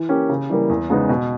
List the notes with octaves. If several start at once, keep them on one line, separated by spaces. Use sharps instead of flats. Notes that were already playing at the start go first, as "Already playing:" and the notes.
Already playing: E3
A#3 C#4 G4
C#3
E3 G3 A#3
E2
C#3 G#3 B3 D#4
B2